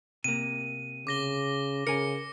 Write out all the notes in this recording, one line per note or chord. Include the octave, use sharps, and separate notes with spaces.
C3 A#3 D#7
C#3 D6 A#6 G7
C#3 A#4 G#5 C#7